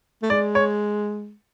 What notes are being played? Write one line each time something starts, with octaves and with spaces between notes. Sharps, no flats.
A3
G#3 D5
C#5